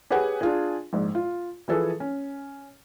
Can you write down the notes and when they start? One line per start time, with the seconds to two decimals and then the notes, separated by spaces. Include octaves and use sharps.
0.10 G4 G#4 B4 C#5 F#5 G#5
0.41 D4 F4 G#4
0.93 A#1 G#2
1.15 F4
1.68 E3 F3 G#4 A4 B4
2.00 C#4